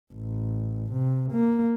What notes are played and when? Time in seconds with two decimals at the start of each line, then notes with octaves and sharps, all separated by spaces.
0.14 A1
0.92 C3
1.32 A#3